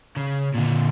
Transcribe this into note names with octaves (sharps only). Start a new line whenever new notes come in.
C#3
A#2 D3